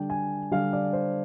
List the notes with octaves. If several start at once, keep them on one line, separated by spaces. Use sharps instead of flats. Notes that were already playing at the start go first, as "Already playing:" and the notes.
Already playing: D3 G3 D4 G5
G#5
D3 G3 D4 F5
D5
C5